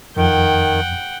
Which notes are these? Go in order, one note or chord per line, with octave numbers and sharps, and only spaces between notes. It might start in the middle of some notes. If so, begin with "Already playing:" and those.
F2 D#3 F#5 G5